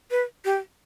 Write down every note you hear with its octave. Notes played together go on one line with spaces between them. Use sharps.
B4
G4